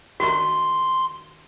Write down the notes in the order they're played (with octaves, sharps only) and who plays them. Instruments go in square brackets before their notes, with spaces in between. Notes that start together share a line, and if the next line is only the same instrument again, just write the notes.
[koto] D#3 A3 D4 [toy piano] F#4 [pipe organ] C6